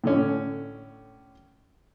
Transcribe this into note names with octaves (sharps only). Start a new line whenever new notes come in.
A2 D3 C#4